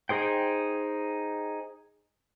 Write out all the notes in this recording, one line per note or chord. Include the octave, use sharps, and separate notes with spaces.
D#4 G#4 C5 G5